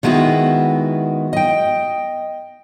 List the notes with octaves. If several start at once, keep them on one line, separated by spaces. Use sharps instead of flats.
D#3 G#3 B3 E4 F#4
D#5 G5